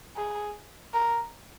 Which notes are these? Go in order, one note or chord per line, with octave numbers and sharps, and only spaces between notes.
G#4
A#4